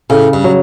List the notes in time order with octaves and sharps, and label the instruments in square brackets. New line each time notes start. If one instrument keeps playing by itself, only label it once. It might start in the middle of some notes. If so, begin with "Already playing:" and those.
[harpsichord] A2 [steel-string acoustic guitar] C#3
[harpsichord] G2
[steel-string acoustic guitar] F#3